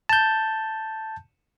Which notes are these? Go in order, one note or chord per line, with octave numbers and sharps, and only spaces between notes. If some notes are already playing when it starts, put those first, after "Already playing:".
A5 G6